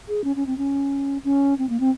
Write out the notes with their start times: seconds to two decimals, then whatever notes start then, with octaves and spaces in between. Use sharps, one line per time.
0.08 G#4
0.24 C#4
0.36 C#4
0.47 C4
0.58 C#4
1.24 C#4
1.58 C4
1.69 A#3
1.80 C4